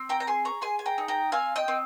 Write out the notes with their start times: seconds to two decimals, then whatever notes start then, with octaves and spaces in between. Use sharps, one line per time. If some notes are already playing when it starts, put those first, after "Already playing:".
Already playing: C4
0.09 G5 A#5
0.20 A#5
0.27 G#4 G#5 C6
0.45 A#5 C#6
0.61 G#4 G#5 C6
0.79 G#5
0.86 G5 A#5
0.98 D#4
1.08 G5 A#5
1.32 C4 F5 G#5
1.56 D#5 G5
1.68 C4